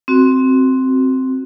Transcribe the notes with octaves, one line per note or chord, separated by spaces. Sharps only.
C4 F#4